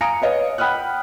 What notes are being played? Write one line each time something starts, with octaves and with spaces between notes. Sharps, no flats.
F5 G#5 A#5 D#6 C#7 D7
B4 C#5 D#5 F5
F#5 G5 B5 D#6 F6 F#6